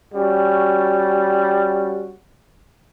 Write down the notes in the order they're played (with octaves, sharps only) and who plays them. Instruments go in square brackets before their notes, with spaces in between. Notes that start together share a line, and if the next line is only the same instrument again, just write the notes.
[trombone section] G3 C#4 F#4